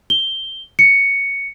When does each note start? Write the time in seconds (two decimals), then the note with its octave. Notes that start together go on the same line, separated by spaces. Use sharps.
0.10 G7
0.79 C#7